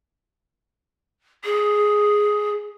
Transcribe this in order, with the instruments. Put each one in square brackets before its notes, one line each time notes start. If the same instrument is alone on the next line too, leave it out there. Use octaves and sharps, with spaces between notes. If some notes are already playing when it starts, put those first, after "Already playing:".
[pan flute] G#4